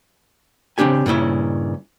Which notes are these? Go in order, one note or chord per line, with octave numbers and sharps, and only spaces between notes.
C#3 C4 D4 G4 G#5
G2 A#2 C#3 E4 C#5